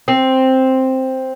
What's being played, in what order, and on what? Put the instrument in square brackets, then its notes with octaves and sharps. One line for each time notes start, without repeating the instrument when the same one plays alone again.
[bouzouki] C4